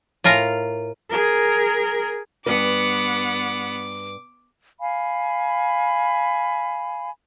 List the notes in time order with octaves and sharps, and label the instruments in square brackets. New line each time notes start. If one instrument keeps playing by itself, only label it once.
[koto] A2 F4 A#4 G#5 A#5
[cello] G#4 A#4
[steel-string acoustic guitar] G2 B4 [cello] B3 F#5 [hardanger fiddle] D6
[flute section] F5 G#5 B5